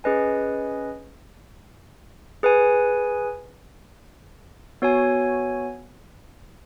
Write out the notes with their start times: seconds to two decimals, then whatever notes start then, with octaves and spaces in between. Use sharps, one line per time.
0.04 C#4 G#4 B4 D#5 G#5
2.43 G#4 B4 G#5
4.82 B3 F#4 C#5 G#5